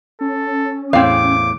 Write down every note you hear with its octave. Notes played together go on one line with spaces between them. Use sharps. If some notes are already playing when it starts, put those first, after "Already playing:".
C#4 A4
E2 A2 C4 F5 D6